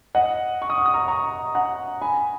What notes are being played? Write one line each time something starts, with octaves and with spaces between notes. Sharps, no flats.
D#5 F#5
C#6
D#6
C#6
D#6
A#5 C#6
A#5 C#6
F#5 A#5
G#5 B5